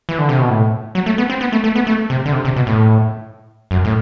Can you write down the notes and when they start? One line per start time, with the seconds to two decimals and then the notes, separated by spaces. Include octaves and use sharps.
0.09 E3
0.19 D3
0.29 C3
0.39 B2
0.49 A2
0.95 F#3
1.06 A3
1.18 B3
1.30 C4
1.41 B3
1.52 A3
1.64 A3
1.75 B3
1.87 A3
2.10 C3
2.26 D3
2.33 C3
2.45 C3
2.56 B2
2.67 A2
3.71 F#2
3.85 A2